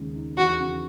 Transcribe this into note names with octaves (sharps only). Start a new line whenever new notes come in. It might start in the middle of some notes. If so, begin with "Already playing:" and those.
Already playing: D#2 C#3 G#3
D#4
E2 F#4
C#3